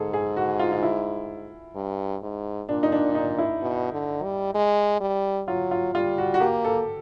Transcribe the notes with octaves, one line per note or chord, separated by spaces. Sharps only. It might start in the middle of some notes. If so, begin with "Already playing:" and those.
Already playing: G#2 G#4 A4
G#4
F#4
F4
F4
E4
G2
G#2
A#2 D4
D#4
D4
D#4
E4
B2
D3
G3
G#3
G3
F#3 F4
F4
G3 F4
F#4
F#4
A#3 G4
A4